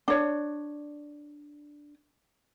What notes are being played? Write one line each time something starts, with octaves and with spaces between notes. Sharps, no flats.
D4 C#5